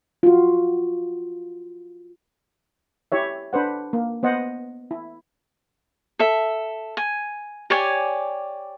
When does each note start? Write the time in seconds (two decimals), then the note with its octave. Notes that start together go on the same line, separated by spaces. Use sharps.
0.23 F4 F#4
3.12 E4 G4 C#5 E5
3.53 D4 B4 C5 F#5
3.93 A#3
4.23 B3 C5 D#5 F#5
4.91 E4
6.19 A4 E5
6.97 G#5
7.70 G4 C#5 D5 G#5